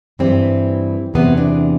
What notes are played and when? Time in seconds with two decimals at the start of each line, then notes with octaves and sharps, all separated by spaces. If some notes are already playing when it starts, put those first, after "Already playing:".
0.19 G2 E3 G3 C4
1.14 E2 C3 E3 B3
1.37 D4